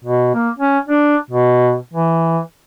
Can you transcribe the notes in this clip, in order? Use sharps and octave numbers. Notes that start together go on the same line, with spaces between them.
B2
A#3
C#4
D4
B2
E3